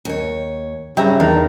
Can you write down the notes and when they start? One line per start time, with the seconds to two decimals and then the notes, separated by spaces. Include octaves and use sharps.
0.05 D#2 C#5
0.97 C#3 G3 G4 E5 A#5
1.20 E2 D#3 E3 D4 A#5